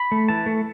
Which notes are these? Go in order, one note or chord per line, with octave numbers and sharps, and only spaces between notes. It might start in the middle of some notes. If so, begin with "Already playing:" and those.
Already playing: B5
A3
E3 A5
A3